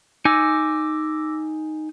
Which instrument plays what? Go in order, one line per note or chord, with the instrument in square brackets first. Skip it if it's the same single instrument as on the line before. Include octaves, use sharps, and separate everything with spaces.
[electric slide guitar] D#4 G#5 [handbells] D6 E6 A#6